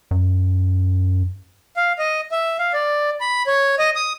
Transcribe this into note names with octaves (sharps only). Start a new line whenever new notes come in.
F#2
F5
D#5
E5
F5
D5
B5
C#5
D#5
D#6